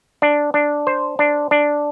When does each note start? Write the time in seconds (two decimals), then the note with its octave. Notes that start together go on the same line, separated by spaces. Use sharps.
0.22 D4
0.54 D4
0.87 C5
1.19 D4
1.51 D4